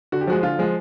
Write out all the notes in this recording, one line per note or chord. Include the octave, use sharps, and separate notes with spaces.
D3 F#4
G4
F3 G#3 F#4
D3 F4
F3 G#3